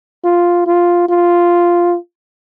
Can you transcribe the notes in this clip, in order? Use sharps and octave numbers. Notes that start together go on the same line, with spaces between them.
F4
F4
F4